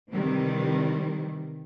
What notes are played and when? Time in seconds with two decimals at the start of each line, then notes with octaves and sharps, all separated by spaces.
0.12 C3 D#3 E3 G3